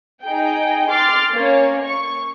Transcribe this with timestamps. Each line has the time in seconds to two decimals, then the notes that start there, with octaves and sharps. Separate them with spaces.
0.23 D#4 G#4 G5
0.90 C6 D6 F6 A6 C7
1.33 A#3 C#4 C#5
1.84 C#6